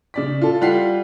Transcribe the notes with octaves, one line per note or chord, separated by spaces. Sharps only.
C#3 D5 B6
F4 A4
G3 F4 F#5 F#6 B6 C7